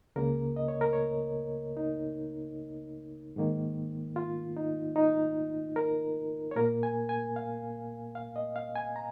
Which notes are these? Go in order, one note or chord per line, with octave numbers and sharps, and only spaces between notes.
C#2 C#3 A#3 A#4
D#5
C#5
A#4
C#5
D#4
G#2 D#3 A#3
F4
D#4
D#4
A#4
C#5
A#2 A#3 A#4
G#5
G#5
F5
F5
D#5
F5
G#5
A#5